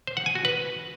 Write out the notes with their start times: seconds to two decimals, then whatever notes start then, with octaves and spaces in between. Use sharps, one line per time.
0.07 C5
0.17 F#5
0.26 G#5
0.35 F#4
0.45 B4